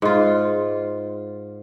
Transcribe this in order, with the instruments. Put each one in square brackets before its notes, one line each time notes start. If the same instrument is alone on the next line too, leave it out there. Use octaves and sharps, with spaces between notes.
[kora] G#2 F4